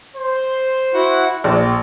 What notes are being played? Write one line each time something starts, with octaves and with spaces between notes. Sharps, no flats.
C5
E4 F#4 F#5
A#1 A5